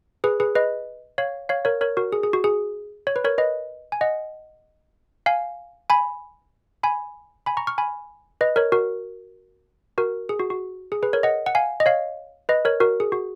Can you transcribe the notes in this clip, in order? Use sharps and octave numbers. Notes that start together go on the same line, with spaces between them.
G#4 B4
G#4 B4
B4 D#5
C#5 F5
C#5 F5
A#4 C#5
A#4 C#5
F#4 A#4
G#4
G#4
F#4
G#4
C#5
B4
A#4 C#5
B4 D#5
G#5
D#5 F#5
F5 G#5
G#5 B5
G#5 B5
G#5 B5
A#5 C#6
C#6 F6
G#5 B5
B4 D#5
A#4 C#5
F#4 A#4
F#4 A#4
G#4
F#4
F#4
G#4
G#4 B4
A#4 C#5
D#5 F#5
F#5
F5 G#5
D#5
C#5 F5
B4 D#5
A#4 C#5
F#4 A#4
G#4
F#4